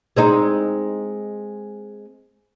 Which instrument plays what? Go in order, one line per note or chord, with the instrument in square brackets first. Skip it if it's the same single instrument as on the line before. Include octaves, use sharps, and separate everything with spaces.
[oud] G#3 C4 D#4